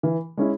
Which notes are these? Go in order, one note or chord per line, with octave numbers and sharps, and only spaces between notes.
E3
G#3 C#4 E4